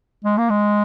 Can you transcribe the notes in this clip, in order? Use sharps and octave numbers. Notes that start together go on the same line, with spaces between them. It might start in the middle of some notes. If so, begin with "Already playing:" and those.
G#3
A#3
G#3